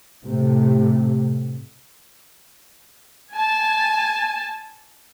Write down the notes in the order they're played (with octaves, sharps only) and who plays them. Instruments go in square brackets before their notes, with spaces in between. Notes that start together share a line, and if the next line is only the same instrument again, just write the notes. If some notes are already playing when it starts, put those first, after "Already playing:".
[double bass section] A2 C3 A3
[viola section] G#5 A5